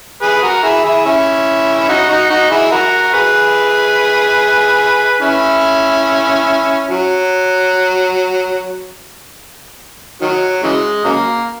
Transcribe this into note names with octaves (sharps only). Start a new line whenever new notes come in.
G#4 B4
F#4 A#4
E4 G#4
E4 G#4
C#4 E4
D#4 F#4
D#4 F#4
D#4 F#4
E4 G#4
F#4 A#4
G#4 B4
C#4 E4
F#3
D#3 F#3
C#3 E3 G#3
C#3 F#3 A#3